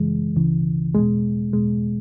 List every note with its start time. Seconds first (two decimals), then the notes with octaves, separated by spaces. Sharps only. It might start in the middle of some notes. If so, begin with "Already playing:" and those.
Already playing: F#2 C#3 E3 G#3
0.36 C#2 C#3 E3
0.94 E2 B2 G#3
1.53 E2 B2 G#3